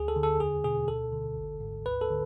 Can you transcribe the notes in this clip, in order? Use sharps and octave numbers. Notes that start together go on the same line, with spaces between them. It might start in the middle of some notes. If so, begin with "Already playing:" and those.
Already playing: D2 G#4
A4
D3
A4
E2 G#4
B2 G#4
D2 A4
D3
G#1
G#2
D2 B4
A4
D3